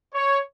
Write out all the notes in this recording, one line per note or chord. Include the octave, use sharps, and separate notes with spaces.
C#5